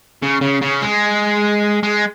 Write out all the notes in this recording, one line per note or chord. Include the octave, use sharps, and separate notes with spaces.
C#3
C#3
C#3
G#3
G#3